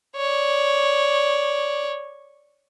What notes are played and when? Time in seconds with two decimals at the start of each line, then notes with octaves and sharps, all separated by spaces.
0.16 C#5 D5